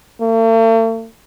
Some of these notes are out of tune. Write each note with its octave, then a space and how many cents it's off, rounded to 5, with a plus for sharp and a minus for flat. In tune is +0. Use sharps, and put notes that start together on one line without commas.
A3 +45